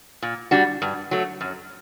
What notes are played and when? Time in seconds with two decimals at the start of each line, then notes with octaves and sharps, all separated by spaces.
0.22 A#2
0.51 G3 D4 F#4
0.82 G2
1.11 F#3 A3
1.41 F#2